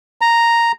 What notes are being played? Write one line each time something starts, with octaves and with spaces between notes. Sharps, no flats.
A#5